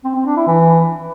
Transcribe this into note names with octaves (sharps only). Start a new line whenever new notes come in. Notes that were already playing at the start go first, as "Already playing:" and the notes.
C4
C4
D4
E4
E3